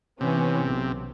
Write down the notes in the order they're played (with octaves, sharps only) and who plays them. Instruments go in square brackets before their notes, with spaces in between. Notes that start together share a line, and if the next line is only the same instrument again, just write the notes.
[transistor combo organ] C3 [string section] E3 B3 C#4
[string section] B1